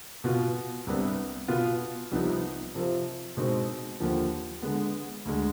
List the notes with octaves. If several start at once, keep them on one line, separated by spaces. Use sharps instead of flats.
B2 B3 F4
C2 C3 G3 B3 D4
B2 B3 F4
C2 C3 F3 B3 D#4
C3 F3 C4 F4
B2 G#3 C4 D#4
D#2 D3 F3
D3 G#3 B3
D2 D3 G#3